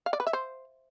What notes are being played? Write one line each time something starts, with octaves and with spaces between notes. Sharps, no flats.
F5
D5
B4
E5
C5